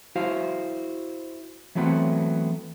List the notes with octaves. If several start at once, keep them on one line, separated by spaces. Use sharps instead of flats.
E4 F#4 C5 F5
E3 F#3 A3 B3 C4 F#4